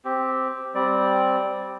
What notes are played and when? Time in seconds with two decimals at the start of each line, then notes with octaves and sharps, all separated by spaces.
0.05 C4 G4
0.75 G3 C4 D5